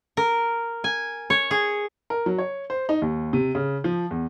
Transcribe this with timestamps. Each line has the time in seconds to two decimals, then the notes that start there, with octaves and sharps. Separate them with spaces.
0.17 A#4
0.84 G#5
1.30 C#5
1.51 G#4
2.10 A#4
2.26 F#3
2.38 C#5
2.70 C5
2.89 D#4
3.02 D#2
3.33 C3
3.55 C#3
3.84 F3
4.11 E2